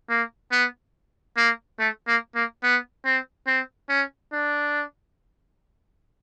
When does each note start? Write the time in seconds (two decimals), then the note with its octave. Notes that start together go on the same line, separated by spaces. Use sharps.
0.10 A#3
0.52 B3
1.37 A#3
1.79 A3
2.07 A#3
2.35 A#3
2.63 B3
3.05 C4
3.47 C4
3.89 C#4
4.32 D4